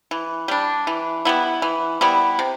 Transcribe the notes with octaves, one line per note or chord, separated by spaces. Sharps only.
E3
G3 D4
E3
G3 B3 E4
E3
G3 B3 E4
C3